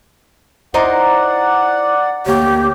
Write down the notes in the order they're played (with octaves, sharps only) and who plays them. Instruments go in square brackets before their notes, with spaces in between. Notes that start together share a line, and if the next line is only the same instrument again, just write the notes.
[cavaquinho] D#4 A#4 C6 [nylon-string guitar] E4 C5 D#5 [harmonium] D5 F#5
[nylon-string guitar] D2 A#3 [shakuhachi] G4 [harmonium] C#5